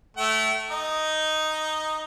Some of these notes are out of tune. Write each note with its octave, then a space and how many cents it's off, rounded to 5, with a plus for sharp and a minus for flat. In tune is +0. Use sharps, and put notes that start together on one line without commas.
A3 -5 G5 -40
D#4 +0 D#5 +0